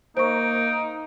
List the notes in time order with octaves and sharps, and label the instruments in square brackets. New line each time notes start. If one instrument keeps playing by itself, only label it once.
[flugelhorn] A#3 [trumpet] D#4 [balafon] C5 C#6 [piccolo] D7